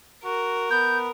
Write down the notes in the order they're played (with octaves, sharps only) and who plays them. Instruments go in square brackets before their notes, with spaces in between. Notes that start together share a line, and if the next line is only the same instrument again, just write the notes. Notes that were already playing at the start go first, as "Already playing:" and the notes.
[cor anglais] F#4 [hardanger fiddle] A#4
[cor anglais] B3 [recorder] G6